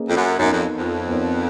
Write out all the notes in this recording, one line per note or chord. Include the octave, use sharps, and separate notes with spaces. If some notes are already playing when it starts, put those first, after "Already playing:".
Already playing: A#3 C#4 G#4 B4 D#5
F2
F#2
F#2 B3 D#4 A#4 C#5
F2
F2
B3 D#4 A#4 C#5